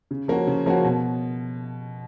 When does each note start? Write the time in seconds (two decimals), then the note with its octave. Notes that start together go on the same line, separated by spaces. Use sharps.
0.11 C#3
0.28 F3 A#3 C#4 F#4
0.47 C#3
0.66 F3 A#3 C#4 F#4
0.84 B2